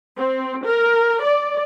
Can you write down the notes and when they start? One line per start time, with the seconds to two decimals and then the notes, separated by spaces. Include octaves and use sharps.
0.18 C4
0.65 A#4
1.23 D5